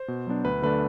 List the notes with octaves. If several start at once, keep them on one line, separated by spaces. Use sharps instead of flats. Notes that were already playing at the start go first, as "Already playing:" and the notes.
Already playing: C5
B2
F#3 B3 D4
D2 B4
D3 A3 D4 B4